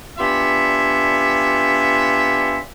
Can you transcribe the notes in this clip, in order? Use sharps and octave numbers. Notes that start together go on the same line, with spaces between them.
B3 D4 F4 G4 E5 G#5